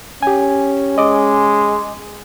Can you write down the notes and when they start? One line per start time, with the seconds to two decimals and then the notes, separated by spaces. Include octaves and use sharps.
0.23 C#4 G4 G#5
0.98 G#3 D#5 D6